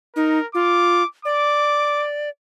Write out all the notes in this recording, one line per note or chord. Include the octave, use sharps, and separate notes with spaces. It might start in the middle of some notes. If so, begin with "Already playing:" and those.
D#4 A#4
F4 D6
D5 D6